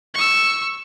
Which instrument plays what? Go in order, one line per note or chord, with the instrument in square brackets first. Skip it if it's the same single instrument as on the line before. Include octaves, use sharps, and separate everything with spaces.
[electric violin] C#6 E6